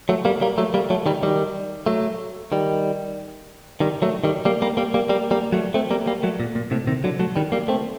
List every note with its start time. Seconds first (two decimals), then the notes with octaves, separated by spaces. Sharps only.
0.09 F#3 A3
0.25 G3 A#3
0.41 G3 A#3
0.58 F#3 A3
0.74 G3 A#3
0.90 F#3 A3
1.06 D#3 G3
1.23 D#3 G3
1.86 F#3 A3
2.52 D#3 G3
3.80 D#3 G3
4.02 F#3 A3
4.24 D#3 G3
4.45 G3 A#3
4.62 G3 A#3
4.77 G3 A#3
4.94 G3 A#3
5.09 G3 A#3
5.31 G3 A#3
5.52 F#3 A3
5.74 A3 C4
5.91 G3 A#3
6.07 G3 A#3
6.23 F#3 A3
6.40 A#2
6.55 A#2
6.71 A2 C3
6.87 C3 D#3
7.04 D3 F#3
7.20 F#3 A3
7.36 D#3 G3
7.52 G3 A#3
7.68 A3 C4